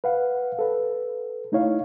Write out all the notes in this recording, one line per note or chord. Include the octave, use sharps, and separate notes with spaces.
B4 F5 F#5
A4 B4
A3 D#4 E4 C#5 F5